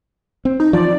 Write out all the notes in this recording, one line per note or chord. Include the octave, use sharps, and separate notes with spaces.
C4
D#4
E3 F3 D5